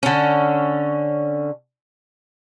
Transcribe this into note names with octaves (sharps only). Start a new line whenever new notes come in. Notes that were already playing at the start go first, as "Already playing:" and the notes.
D3 C#4